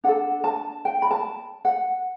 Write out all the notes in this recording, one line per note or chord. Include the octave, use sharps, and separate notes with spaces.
D4 A4 F#5
A5
G5
B5
A5
F#5